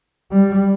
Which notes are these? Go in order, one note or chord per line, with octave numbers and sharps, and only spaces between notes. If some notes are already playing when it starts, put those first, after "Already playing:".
G3